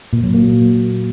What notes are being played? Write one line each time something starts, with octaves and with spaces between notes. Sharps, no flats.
A#2
F#3
A#3